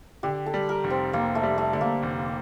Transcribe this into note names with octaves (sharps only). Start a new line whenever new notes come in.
D3 G4
A4
G3
A#4
F1
C4
F1 A#3
A3
G3
A3
D3 A3
A#3
F1